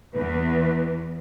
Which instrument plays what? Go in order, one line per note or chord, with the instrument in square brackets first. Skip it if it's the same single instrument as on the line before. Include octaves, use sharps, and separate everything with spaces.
[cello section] E2 [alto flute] B4